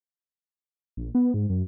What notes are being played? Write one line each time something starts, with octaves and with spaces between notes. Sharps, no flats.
A#1
B3
G#2
F#2